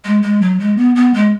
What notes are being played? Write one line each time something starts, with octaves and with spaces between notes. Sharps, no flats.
G#3
G#3
F#3
G#3
B3
B3
G#3